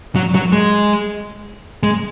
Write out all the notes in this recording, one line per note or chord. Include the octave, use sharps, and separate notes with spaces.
F#3
F#3
G#3
G#3